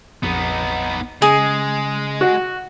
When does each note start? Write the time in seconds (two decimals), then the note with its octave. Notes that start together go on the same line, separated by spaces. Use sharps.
0.23 A#1 F2 B3 D#4
1.22 C#3 G#3 G#4
2.21 F#4